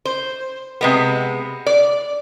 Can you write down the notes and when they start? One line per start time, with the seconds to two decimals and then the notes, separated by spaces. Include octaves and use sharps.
0.05 C5
0.81 C3 G#3 B3
1.66 D5